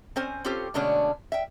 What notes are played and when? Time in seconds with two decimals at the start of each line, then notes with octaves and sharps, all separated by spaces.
0.16 C4 C#4 C5 G#5
0.45 C4 C#4 F4 G4 A4 C5
0.74 B2 D3 G#3 A3 C#4 D4
1.32 E5 G5